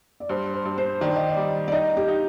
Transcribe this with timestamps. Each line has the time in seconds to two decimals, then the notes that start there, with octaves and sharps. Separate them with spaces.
0.20 D5
0.29 G2 C5
0.54 C5
0.65 G2
0.78 C5
1.01 D#3 D5
1.16 D#5
1.29 D5
1.37 G3
1.68 D5
1.72 D#4 D#5
1.97 G4
2.08 D#4